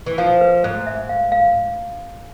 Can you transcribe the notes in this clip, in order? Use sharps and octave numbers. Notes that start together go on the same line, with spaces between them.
E3
F3 F5
B4
G#2 C5
E5
F5
F5